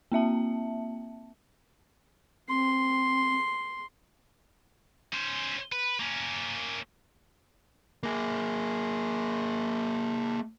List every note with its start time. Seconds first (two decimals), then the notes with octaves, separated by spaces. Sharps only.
0.12 A#3 C4 E5 A5
2.48 C4 C6
5.13 C#4 C5
5.72 B4
6.00 A#3 C#4
8.03 A#3 G#4